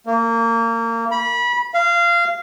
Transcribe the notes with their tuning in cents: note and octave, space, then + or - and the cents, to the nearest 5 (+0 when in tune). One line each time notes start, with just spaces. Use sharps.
A#3 -25
B5 -25
F5 -20